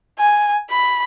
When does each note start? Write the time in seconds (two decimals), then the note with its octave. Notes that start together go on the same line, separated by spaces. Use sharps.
0.19 G#5
0.70 B5